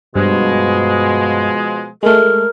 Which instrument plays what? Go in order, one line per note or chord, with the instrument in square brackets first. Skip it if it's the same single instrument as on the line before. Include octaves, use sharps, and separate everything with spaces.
[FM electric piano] G2 [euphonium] B2 [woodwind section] F3 G#3
[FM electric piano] G#3 A3 [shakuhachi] A#4